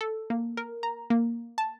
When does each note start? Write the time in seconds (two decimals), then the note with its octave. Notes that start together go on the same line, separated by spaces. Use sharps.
0.01 A4
0.30 A#3
0.57 A#4
0.83 A#5
1.10 A#3
1.58 A5